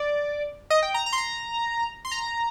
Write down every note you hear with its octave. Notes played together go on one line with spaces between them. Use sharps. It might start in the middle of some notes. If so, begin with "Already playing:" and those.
Already playing: D5
D#5
G5
A#5
A#5
C6
A#5
C6
A#5